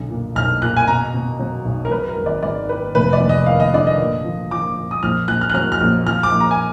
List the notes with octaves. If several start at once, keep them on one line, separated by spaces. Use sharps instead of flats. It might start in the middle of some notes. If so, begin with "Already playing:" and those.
Already playing: B1 D3
A#2
B1 F6
A#2 F#6
G#5
B2 A#5
B2
F#3
B1
A#4
F#3 B4
A#4
G#1
D5
G#2 D5
D#3 B4
F1 B4
D5
F1
D#5
D#2 F5
D#5
D3 D5
D#5
A#2
F3
F3 D6
A#2
D#6
A#1 F6
A#1 F#6
F6
F#6
F#3 F6
F6
A#1
F3 F6
D6
A#1
A#5
G#5